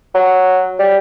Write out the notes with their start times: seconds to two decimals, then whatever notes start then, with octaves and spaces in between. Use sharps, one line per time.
0.14 F#3
0.79 G3